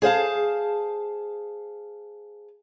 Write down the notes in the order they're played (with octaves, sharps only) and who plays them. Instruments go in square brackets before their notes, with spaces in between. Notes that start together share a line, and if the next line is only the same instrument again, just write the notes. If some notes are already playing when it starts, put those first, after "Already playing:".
[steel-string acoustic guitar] G#4 C5 F5 A5